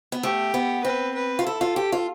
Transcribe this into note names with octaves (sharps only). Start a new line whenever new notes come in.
B3
A3 G4
B3
C4 B4
B4
F4
E4 A4
F4
G4
F4